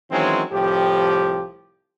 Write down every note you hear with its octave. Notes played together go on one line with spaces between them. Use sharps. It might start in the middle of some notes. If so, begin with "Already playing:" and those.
D#3 E3 F#3 G#3 C4 C#4
C2 A2 F3 G4